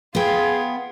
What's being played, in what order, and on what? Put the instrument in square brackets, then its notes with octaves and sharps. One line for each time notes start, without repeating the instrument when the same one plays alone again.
[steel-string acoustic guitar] B3 G5 [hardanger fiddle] F4 [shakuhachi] G#4